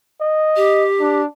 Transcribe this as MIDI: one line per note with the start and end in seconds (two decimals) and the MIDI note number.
0.21 0.85 75
0.56 1.21 67
1.00 1.26 62